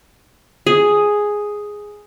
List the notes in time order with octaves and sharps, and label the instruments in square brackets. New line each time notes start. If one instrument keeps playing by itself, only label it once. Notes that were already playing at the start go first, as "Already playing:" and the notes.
[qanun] G#4